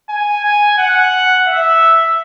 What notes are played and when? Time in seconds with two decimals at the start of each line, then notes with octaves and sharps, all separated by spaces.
0.09 G#5
0.44 G#5
0.78 F#5
1.47 E5